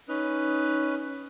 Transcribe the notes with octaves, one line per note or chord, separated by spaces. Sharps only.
C#4 D#4 B4